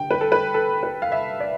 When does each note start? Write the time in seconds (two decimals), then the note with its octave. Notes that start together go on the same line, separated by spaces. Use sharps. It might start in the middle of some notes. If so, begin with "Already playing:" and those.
Already playing: G2 D3 G5
0.11 B4
0.21 A4
0.32 B4
0.54 A4
0.83 B4
1.02 F5
1.12 E5
1.40 D5